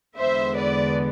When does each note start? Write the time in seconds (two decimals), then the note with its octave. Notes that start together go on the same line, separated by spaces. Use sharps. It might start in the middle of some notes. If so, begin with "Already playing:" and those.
0.17 E2 D3 G#3 B3 C5 E5
0.56 B4 D5